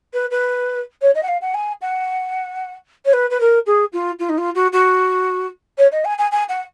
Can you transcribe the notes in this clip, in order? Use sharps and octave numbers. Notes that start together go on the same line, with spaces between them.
B4
B4
C#5
D#5
F#5
F5
F#5
G#5
F#5
C#5
B4
B4
A#4
G#4
F4
F4
D#4
F4
F#4
F#4
C#5
D#5
G#5
G#5
G#5
F#5